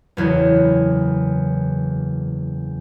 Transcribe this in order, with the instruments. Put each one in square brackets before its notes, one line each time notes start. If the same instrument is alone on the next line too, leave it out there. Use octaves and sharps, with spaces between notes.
[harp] F#1 E2 C#3 F#4